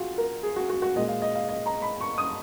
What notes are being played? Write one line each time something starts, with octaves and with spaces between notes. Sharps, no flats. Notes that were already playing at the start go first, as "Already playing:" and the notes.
Already playing: F4 F#4 G#4
A#4
G#4
F#4
F#4
F#4
A#2 G#3 D#5
F5
D#5
F5
D#5
A#5
B5
C#6
D#6